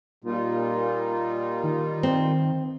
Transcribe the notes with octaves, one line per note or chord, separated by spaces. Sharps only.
A#2 G3 D#4 F4
D#3
C4